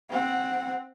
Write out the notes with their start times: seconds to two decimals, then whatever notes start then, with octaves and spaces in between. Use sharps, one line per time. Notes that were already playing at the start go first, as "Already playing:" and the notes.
0.10 C4 F#5